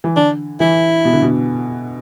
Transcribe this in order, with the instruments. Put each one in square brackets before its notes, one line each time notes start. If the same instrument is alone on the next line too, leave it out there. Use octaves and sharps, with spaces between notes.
[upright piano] E3
[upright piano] D3 [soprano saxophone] D4
[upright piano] E3 [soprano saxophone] E4
[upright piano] B2
D3
B2